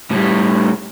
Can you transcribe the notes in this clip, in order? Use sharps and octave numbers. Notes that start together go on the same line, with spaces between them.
A2 G3